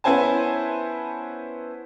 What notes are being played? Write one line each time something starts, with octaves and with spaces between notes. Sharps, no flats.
B3 C#4 E4 C5 G#5 A5